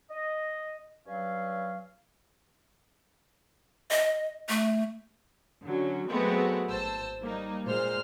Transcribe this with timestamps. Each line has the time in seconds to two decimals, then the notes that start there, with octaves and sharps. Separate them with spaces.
0.11 D#5
1.07 G2 F#3 C#4 F5
3.91 D#5
4.49 A3
5.65 D3 F#3 C#4
6.10 F#3 G#3 A3 B3 C4 F#4
6.70 G#1 C5 A5 E6
7.22 G3 A#3 D#4
7.66 A#2 G#3 C5 F6